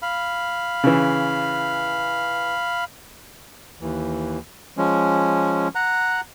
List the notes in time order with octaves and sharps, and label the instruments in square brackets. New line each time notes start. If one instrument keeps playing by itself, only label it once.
[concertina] F5 B5
[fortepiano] C#3 E3
[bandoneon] D#2 E3
F3 G#3 C#4
F#5 A#5 F#6